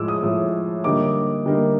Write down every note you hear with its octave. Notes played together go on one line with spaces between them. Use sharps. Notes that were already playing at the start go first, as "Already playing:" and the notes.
Already playing: A2 F3 G#3 D6 E6
D#6
A2 F3 G#3
D3 G3 A#3 D#4 D6
D3 G3 A#3 D#4